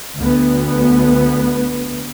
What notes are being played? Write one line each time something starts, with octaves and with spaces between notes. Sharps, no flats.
D2 B3